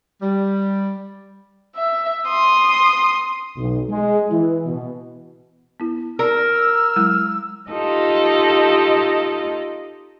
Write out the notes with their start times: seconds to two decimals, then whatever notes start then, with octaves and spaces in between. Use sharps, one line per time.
0.21 G3
1.76 E5
2.28 C6 D#6
3.57 B1
3.89 G#3
4.29 E3
4.66 B2
5.80 B3 E4
6.19 A#4 D5 E6 F6
6.96 F#3 G#3 E4
7.72 D#4 F4 G4 A4 D#5